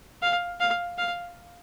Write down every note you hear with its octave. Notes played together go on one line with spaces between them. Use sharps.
F5
F5
F5